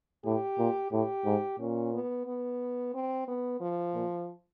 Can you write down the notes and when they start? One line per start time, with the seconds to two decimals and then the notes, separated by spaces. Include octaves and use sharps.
0.25 A2 G4
0.59 A#2
0.92 A2 G4
1.26 G#2
1.59 A#2 C#4
1.93 B3
2.27 B3
2.94 C4
3.28 B3
3.60 F3
3.95 A#2